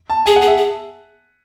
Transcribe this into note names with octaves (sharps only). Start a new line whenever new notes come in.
A5
G#4 G#5
F#5
G#4
E5
G#4